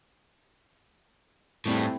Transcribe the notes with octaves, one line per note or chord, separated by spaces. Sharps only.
A2 G3 A3 C4 E4